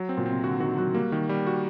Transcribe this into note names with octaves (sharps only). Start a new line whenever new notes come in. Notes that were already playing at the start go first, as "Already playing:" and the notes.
Already playing: F#3
C4
A#2
C4
C3
D3 F#4
D#3 F#4
F#3 F#4
G3 A#3
D#3
G3
F#4